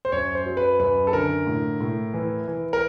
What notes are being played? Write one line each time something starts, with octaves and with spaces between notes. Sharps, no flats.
C5
F#2 C#5
C5
F#3
B4
F#2 B4
A4
D3 A#4
A2
A2
E3
E3
A#4